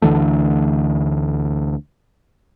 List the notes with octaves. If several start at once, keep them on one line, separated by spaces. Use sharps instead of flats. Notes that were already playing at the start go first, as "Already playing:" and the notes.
D2 D3 E3 A3